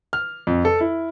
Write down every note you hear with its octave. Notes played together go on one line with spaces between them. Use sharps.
F6
F2
A4
E4